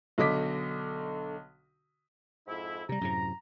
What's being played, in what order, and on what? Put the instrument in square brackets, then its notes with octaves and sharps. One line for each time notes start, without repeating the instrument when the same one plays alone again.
[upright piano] B1 D3 D#5 D6 B6
[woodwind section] F2 G#2 E4
[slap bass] C3 G3 [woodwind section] A#5
[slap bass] F#2 A2 C3